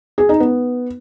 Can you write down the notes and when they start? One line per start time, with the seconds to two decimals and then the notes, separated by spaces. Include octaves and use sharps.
0.18 G#4
0.29 D#4
0.40 B3